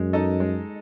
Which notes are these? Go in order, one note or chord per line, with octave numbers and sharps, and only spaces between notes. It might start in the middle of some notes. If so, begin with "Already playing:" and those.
Already playing: F#2 G#3
D#4 A4 D#5
G#3